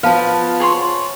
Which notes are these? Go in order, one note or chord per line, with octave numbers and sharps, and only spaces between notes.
F3 B3 B4 F5 A5
G#4 C#5 C6